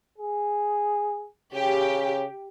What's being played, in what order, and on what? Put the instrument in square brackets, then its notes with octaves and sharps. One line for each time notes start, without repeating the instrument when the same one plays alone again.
[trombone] G#4
[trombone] C#3 [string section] G4